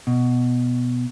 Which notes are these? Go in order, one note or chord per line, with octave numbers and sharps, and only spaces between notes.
B2